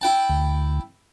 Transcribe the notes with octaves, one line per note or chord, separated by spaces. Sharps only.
E4 G5 A5
D2